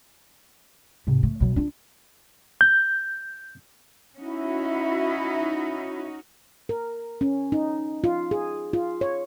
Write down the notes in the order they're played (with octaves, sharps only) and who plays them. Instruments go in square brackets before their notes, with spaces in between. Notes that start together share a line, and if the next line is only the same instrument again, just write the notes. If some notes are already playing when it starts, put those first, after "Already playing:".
[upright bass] G#2 C3
A3
B2 F#3
D4 F4
[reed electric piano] G6
[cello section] C#4 D#4 F#4 [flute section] E4
[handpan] A#4
C#4
D#4
F4
G#4
F4
C#5